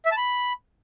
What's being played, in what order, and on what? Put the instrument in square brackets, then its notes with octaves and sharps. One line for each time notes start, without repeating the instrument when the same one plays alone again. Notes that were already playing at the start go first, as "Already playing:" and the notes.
[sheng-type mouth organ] E5
A5
B5